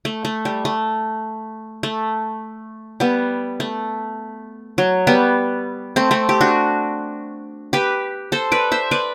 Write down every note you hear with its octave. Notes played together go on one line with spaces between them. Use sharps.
A3
A3
G3
A3
A3
G3 B3
A3
F#3
G3 B3
A3 C4
A3 C4
G4
D4 F#4
G4 B4
A4 C5
B4 D5
C5 E5
B4 D5